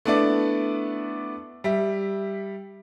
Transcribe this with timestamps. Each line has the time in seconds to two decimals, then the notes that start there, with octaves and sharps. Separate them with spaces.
0.05 A3 B3 D4 E4 D5
1.64 G3 E5